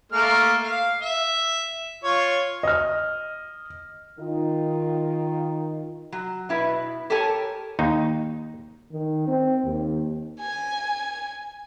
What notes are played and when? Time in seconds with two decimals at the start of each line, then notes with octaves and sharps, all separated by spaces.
0.12 A3 A#3 F6
0.63 F5
1.02 E5
2.04 F4 C#5
2.63 D#5 F6
4.19 D#3 D#4 F4
6.12 F#3
6.49 B2 E4 B4
7.10 G4 A4 A#4 C#5 G#5 A5
7.79 D#2 D#4
8.92 D#3
9.27 C4
9.63 D#2
10.40 G#5